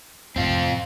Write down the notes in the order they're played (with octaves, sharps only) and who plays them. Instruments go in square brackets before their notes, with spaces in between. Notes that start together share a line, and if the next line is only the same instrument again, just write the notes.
[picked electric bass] F2 A2 C3 [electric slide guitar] C4 F4